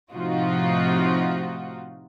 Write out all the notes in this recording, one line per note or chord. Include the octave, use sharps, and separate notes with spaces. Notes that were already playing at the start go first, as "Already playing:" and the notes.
A2 C3 F3 D#4 F4 F#4